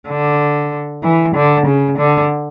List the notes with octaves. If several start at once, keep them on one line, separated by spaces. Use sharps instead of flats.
D3
E3
D3
C#3
D3